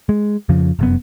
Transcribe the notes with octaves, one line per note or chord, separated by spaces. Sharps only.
G#3
F2 C#3 F3
F1 F#2 B3